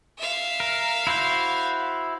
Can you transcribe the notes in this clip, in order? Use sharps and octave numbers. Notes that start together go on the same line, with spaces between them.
E5 F5
A#4
E4 F#4 C5